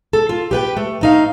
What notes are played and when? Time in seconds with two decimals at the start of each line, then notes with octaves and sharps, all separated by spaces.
0.13 A4
0.29 F4
0.51 G4 B4 G5
0.77 A3
1.01 A3 D#4 F5